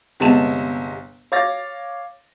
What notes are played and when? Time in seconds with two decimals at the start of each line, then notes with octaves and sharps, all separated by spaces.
0.20 G1 C3 G#3 B3 A5 E7
1.32 C#5 F5 D6 A6 A#6